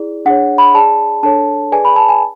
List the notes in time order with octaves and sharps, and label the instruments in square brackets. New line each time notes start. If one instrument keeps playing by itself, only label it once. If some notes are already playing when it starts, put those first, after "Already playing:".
Already playing: [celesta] E4 G#4 D5
D4 G#4 C#5 F#5
B5
G#4 D5 A5
D4 A4 C#5 A5
G#4 B4 D5 G#5
B5
A5
G#5